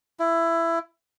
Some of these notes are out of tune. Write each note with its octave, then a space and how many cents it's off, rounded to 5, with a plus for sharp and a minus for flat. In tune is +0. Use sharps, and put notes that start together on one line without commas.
E4 +15